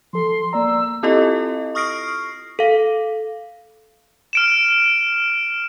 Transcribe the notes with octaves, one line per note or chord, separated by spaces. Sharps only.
F3 A4 C6
A#3 D5 A#5 E6
C4 E4 F4 G4 A4 D#5
C#6 D#6 F6 A#6 C7 D7
A4 F5
F6 D7 E7